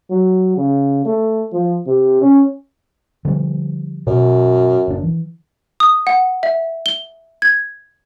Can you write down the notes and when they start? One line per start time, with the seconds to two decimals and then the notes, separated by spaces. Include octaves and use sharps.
0.11 F#3
0.57 C#3
1.06 A3
1.53 F3
1.87 C3
2.22 C#4
3.25 D3 F3 G3
4.07 F#2 B2
4.88 F#1 D4
5.03 E3
5.80 D#6
6.07 F#5
6.43 E5
6.86 G7
7.42 G#6